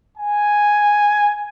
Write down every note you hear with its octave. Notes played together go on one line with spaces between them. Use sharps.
G#5